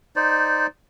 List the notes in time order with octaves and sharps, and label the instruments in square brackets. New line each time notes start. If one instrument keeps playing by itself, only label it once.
[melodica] D#4 C5 D5